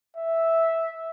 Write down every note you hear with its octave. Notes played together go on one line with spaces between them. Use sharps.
E5